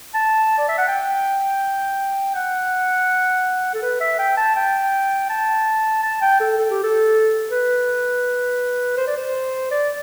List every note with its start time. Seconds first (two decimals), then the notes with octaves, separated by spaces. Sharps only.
0.14 A5
0.58 D5
0.68 E5
0.78 F#5
0.88 G5
2.35 F#5
3.74 A4
3.82 B4
4.00 E5
4.19 G5
4.37 A5
4.56 G5
5.29 A5
6.03 A5
6.22 G5
6.40 A4
6.58 A4
6.71 G4
6.83 A4
7.50 B4
8.97 C5
9.07 D5
9.17 C5
9.71 D5